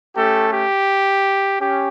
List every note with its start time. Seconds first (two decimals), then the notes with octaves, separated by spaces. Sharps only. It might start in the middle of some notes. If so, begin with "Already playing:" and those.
0.15 A3 C#4 G4 A4
0.52 G4
1.60 C#4 G4